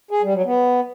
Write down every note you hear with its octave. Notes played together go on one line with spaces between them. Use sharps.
G#4
G3
F#3
B3